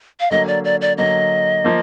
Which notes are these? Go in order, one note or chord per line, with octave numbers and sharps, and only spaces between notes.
F5
D3 F#3 A#3 D#5
D5
D5
D5
D3 F#3 A#3 D#5
F3 A#3